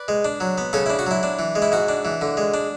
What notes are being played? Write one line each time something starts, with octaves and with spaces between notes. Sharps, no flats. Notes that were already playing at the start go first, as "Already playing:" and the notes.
Already playing: B4 D5
G#3
D4
F#3
B3
C#3 A4 C#5
E4
D4
F#4
F#3 E4
D4
E3
G#3
E4
G#2 F#4
D4
E3
D3
G#3
D4